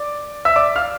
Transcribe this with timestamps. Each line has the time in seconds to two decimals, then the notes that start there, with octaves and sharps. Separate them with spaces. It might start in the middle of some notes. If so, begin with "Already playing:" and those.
Already playing: D5 D6
0.45 E5 E6
0.56 D5 D6
0.75 F5 F6